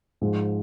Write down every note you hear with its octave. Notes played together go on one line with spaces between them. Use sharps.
G#2 F3 G#3